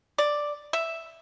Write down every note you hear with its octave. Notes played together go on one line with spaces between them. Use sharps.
D5
E5